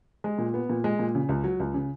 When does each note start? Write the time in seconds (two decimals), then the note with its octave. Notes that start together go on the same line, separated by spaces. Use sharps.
0.24 G#3
0.38 A#2
0.54 B3
0.69 A#2
0.84 G#3
0.99 A#2
1.15 C#3
1.29 C#2
1.44 F#3
1.60 C#2
1.74 C#3